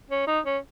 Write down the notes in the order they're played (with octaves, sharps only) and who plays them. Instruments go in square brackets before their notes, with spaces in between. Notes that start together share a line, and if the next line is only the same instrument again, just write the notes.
[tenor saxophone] C#4
D#4
C#4